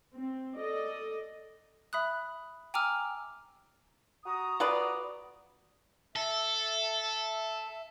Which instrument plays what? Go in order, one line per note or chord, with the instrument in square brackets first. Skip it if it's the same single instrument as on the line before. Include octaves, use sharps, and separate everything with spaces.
[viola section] C4
A4 D5 D#5
[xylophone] E5 B5 D#6 F#6
G5 G#5 A#5 D6 E6 F6
[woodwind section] F#4 A#5 D#6
[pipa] F4 B4 D5
[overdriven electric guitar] A4 [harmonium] E5